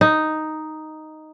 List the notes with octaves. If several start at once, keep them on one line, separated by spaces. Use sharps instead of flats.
D#4